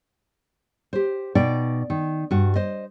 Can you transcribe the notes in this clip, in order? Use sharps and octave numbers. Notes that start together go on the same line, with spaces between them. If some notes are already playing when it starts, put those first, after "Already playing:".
G4 C5
B2 D#4 D5 G5
D#3
G2 F#4
C5 D#5